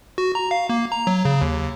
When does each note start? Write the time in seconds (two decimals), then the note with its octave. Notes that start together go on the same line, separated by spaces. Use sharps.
0.18 F#4
0.35 A#5
0.51 F5
0.69 A#3
0.92 A#5
1.07 F#3
1.25 C#3
1.41 D#2